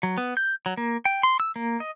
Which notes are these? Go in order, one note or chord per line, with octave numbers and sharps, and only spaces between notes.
F#3
B3
G6
F#3
A#3
G5
C6
E6
A#3
D#5